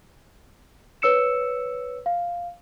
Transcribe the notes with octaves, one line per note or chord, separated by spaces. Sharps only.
B4 C#5 E6 C#7 E7
F5